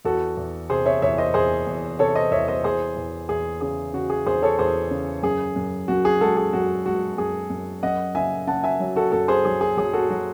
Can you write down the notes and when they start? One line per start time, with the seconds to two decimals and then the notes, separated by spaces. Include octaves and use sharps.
0.05 E2 F#4 A4
0.37 E2
0.70 C3 G#4 C5
0.86 C#5 E5
1.02 E2 C#5 E5
1.18 C5 D#5
1.34 E2 G#4 C5
1.67 E2
1.99 C3 A4 C#5
2.15 C5 D#5
2.31 E2 C#5 E5
2.48 C5 D#5
2.64 E2 G#4 C5
2.97 E2
3.29 E2 G#4
3.61 C#3 G#4
3.93 C#3 F#4
4.10 G#4
4.26 E2 G#4 C5
4.42 A4 C#5
4.59 E2 G#4 C5
4.91 C#3
5.23 F#2 G#4
5.56 F#2
5.88 F#2 F#4
6.05 G#4
6.20 G#3 F#4 A4
6.36 G#4
6.53 F#2 F#4
6.86 G#3 F#4
7.18 F#2 G#4
7.50 F#2
7.83 F#2 D#5 F#5
8.15 C#3 E5 G#5
8.47 C#3 F#5 A5
8.64 E5 G#5
8.80 F#3
8.96 F#4 A4
9.12 F#2 F#4 A4
9.28 G#4 C5
9.45 F#3 G#4
9.61 G#4
9.77 F#3 G#4
9.93 F#4 A4
10.09 F#3 F#4